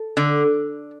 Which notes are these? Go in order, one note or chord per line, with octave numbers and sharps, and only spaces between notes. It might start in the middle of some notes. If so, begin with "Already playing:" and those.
Already playing: A4
D3